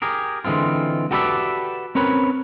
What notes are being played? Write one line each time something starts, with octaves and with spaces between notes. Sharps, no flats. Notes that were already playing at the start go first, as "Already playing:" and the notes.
G4 G#4 A#4
D3 E3 G#3 C4 F4
F#4 G4 A4 B4 D5 E5
C4 C#4 A#4 B4 C#5